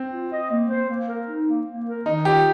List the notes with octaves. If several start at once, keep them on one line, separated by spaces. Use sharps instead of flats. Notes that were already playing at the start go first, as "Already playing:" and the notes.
Already playing: C4
F4
D#5
A#3
C5
A#3
A#4
D#4
A#3
A#3
A#4
D#3 D#4
F4 G4